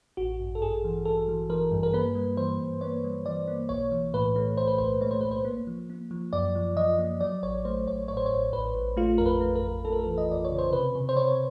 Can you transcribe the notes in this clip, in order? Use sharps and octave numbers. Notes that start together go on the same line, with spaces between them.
A1 F#4
G2
A4
G2 G#4
E3
E3 A4
E3
E3 A#4
G2
A#4
A#3 B4
G3
E3 C5
G2
A#3 C#5
G3
E3 D5
A#3
B1 C#5
E3
A2 B4
A3
A2 C5
B4
B1 C5
A3 C#5
C5
B1 B4
C5
A#3
F3
A#3
F3
F#2 D5
F3
F3 D#5
A#3
F#3 D5
A1 C#5
A3 C5
A1 C#5
A2 C#5
C5
A1 C#5
A1 B4
A1
A3 F4
F2 A#4
B4
A3
A#4
F2
A3 A4
A#4
A4
E3
D#5
F2 D5
C#5
C#3
C5
C3 B4
C3
C5
C3 C#5